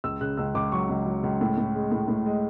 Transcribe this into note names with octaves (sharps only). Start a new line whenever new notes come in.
C#2 E6
C#3 F#6
C#2 E6
C#2 D6
F#3 C#6
C#2
F#3
C#2
A2
A2
G#3
A2
A2
G#3